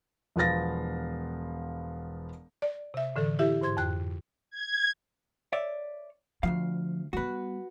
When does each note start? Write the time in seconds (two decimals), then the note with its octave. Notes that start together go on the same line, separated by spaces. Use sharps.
0.36 E1 F3 B3 F5 A6 A#6
2.62 D5
2.94 C3 E5
3.16 A2 D3 E3 A4
3.39 E4 G4 E5
3.61 G#2 C5 C6 G#6
3.77 F2 G5 F#6
4.50 G#6
5.53 C#5 D5 E5
6.43 D2 G#2 F3 F5
7.13 G3 B3 F#4 B4